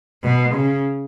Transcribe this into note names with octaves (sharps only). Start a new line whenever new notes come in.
B2
C#3